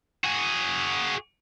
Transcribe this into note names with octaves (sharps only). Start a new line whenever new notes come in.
F#4 G#4